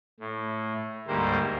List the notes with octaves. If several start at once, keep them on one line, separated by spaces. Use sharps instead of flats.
A2
D2 G#2 G3 A#3 C5